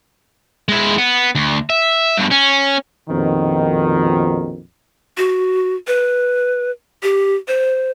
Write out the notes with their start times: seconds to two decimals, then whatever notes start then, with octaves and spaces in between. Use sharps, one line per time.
0.69 G#3 E4
0.98 B3
1.35 D2
1.70 E5
2.18 G2 B2
2.31 C#4
3.08 A#1 F2 B2 D#3
5.17 F#4
5.87 B4
7.03 G4
7.48 C5